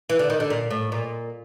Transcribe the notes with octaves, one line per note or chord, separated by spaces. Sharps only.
E3
D3
D#3
D3
A#2
A2
A#2